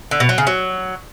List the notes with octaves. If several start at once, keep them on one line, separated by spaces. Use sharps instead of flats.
D3
B2
F#3
C#3
F#3